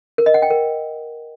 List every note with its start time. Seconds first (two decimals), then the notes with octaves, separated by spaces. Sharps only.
0.18 A#4
0.26 D#5
0.34 F#5
0.42 G5
0.50 A#4